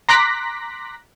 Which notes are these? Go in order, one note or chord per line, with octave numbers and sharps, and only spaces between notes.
A#5 C6 D6 F#6 A#6 B6